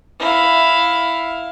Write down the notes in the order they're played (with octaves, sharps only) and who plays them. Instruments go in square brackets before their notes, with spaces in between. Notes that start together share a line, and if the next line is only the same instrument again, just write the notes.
[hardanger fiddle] E4 F5